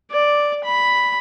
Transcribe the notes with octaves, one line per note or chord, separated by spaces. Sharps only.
D5
B5